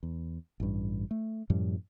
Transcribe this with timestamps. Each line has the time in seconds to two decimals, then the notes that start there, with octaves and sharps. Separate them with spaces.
0.03 E2
0.60 A1 G2
1.11 A3
1.50 F#2 A2 F3 G3